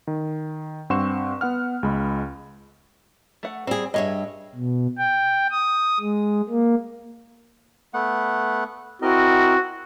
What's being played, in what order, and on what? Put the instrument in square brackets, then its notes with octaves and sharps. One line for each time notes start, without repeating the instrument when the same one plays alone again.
[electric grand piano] D#3
G2 C4 F#5 C6 C#6 E7
B3 F#5 F6
C#2 G#3 B5
[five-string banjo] A3 F#5
[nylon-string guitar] G3 G#4 [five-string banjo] C4
[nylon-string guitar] G2 C#5 E5 [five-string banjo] G#4 D#5
[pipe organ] B2
G5
D#6
G#3
A#3
[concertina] A3 B3 F#5
[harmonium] C4 E4 [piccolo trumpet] F#4 [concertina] A#4 D#5